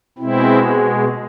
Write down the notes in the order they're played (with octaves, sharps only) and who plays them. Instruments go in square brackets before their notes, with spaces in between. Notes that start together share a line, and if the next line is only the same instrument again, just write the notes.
[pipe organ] B2 G#3 C4 E4